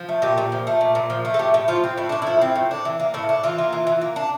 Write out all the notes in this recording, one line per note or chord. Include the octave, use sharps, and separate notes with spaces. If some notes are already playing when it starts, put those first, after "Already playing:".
Already playing: F3
A3
A#2 G4
A#2
F3
A3
A#2
A#2
F3
A3
A4
A2 G4
A2
F3 F4
C4
A2 E4
A2 D4
F3 E4
C4
A2
D4
E3
A#3
A2 E4
D4
E3 F4
A#3
E3
E3
A#3
D4